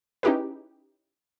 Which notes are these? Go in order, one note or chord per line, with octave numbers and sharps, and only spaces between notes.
C#4 D#4 E4 G4 G#4 B4